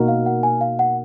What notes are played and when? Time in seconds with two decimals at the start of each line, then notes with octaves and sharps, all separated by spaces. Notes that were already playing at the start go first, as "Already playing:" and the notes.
Already playing: B2 A#3 D#4 F#4 A#4
0.08 F5
0.26 F#5
0.43 G#5
0.61 F5
0.79 F#5